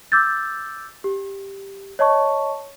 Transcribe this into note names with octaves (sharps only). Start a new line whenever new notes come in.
D6 E6 G6 A6
G4
C#5 D#5 A5 C#6